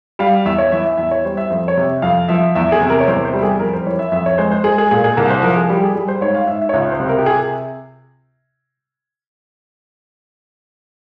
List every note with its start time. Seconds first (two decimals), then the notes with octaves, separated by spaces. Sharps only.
0.19 G3 F5
0.45 E2 E5
0.58 C#5
0.72 E3 E5
0.85 E5
0.98 E2 E5
1.11 C#5
1.25 G3 C5
1.37 E5
1.50 F2 C5
1.68 C#5
1.77 C3
2.02 F2 F5
2.28 F3 E5
2.55 E2 E5
2.72 G#4
2.81 C3
2.90 A#4
3.00 C#5
3.08 E2 C5
3.25 C5
3.33 G3 G4
3.43 G#4
3.60 F2 A#4
3.73 C5
3.86 E3 C#5
3.99 E5
4.12 F2 E5
4.26 C#5
4.38 G#3 C5
4.51 C5
4.64 G#3 G#4
4.78 G#4
4.91 A#2 G#4
5.04 G#4
5.17 C2 A#4
5.30 C5
5.43 F3 A#4
5.57 G#4
5.69 G3 G4
5.83 G#4
5.95 G3 G#4
6.08 C5
6.21 G#2 C#5
6.35 F5
6.47 G#2 E5
6.62 E5
6.69 C#5
6.73 C#2 E5
6.92 C5
7.00 C3
7.09 A#4
7.18 G4
7.26 G#4